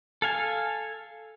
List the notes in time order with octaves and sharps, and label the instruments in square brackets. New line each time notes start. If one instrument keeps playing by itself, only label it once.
[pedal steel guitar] A4 F5 G#5